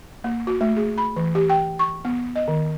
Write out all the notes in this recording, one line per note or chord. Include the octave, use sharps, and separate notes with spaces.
A#3
F#4
A3
G#4
B5
E3
G4
G5
C#6
B3
D#5
D#3